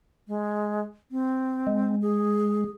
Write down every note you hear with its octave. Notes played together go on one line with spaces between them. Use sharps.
G#3
C4
G#3
G#4